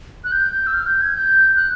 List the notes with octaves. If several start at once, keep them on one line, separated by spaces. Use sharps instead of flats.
F#6
G6
E6
F6
G6
G#6
G6
F#6